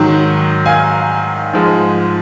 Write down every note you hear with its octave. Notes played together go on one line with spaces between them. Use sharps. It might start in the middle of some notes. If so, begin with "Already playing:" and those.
Already playing: G#2 D#3 F#3
F5 G#5
G#2 F3 G#3